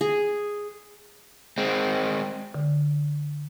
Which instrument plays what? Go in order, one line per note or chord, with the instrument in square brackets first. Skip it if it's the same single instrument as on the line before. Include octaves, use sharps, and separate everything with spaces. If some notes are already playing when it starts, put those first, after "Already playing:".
[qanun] G#4
[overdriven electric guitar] G#3 C4
[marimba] D3